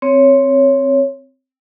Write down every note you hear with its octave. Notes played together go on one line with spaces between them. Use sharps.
C4 C#5